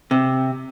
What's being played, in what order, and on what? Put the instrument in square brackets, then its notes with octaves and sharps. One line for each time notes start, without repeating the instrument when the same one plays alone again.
[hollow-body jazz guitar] C3